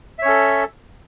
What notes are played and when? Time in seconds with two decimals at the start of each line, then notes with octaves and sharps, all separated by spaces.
0.19 E5
0.22 C#5
0.25 C#4
0.28 A4